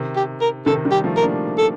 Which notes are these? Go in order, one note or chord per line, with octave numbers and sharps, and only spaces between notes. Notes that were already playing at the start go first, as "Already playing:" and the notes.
Already playing: C3 D#3
G4
A#4
C3 D#3 A4
D#3 G3
G4
F3 A3
A#4
A#3 D4
A4